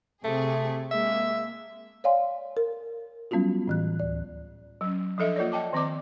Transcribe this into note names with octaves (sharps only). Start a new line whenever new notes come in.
C3 A3 G#4
G#3 A#3 E5
C#5 D5 F5 G#5 C6
A#4
F#3 G3 B3 C#4 F4 F#4
A2 E3 F#6
D2 D5
F#3 C#4
F3 D4 A4 D#5 E5
A#3 F4 A#4 C#5 D5
D#5 G5 A5 D6
D#3 C4 D5 D6